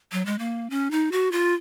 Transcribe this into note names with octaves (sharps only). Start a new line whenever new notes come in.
F#3
G#3
A#3
C#4
D#4
F#4
F4